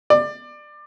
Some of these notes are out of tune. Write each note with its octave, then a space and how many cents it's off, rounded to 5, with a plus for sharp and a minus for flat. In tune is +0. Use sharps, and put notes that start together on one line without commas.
D5 +25